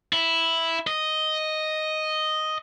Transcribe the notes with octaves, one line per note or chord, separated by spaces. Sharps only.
E4
D#5